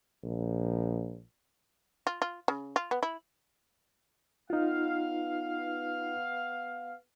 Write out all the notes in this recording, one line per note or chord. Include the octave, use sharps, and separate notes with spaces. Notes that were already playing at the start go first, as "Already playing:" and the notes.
A#1
F4
F4
C#3
F4
B3
E4
B3 D#4 F4 F5